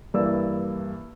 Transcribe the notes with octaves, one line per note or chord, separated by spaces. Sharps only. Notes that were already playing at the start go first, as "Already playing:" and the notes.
G2 E3 A#3 D5 E6